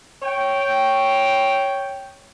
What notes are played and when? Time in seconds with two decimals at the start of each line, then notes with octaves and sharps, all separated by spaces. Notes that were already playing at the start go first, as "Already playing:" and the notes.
0.23 C#5 G5